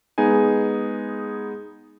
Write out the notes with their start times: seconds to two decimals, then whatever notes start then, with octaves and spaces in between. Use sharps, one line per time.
0.18 G#3 B3 D#4 G#4 G#5